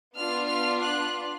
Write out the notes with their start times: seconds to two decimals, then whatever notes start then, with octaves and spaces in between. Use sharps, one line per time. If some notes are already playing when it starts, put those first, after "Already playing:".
0.16 B3 D4 F4 F6
0.50 F6
0.83 F#6